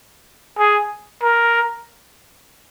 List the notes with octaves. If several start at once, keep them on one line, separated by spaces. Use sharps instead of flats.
G#4
A#4